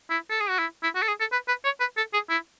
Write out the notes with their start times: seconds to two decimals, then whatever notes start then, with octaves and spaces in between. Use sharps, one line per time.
0.10 E4
0.30 A4
0.40 G#4
0.49 F#4
0.59 E4
0.83 E4
0.96 F#4
1.02 A4
1.08 G#4
1.20 A4
1.32 B4
1.48 B4
1.65 C#5
1.80 B4
1.97 A4
2.14 G#4
2.30 E4